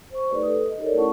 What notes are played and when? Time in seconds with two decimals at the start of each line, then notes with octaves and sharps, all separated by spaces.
0.11 C5 C#6
0.30 A3 D#4 G4 A4 B4 D5
0.42 A4 B4 D#6
0.65 D#5
0.77 D#4 G4 A4 A#4 C#5 D5
0.94 A3 C#4 E4 F#5 A5 C#6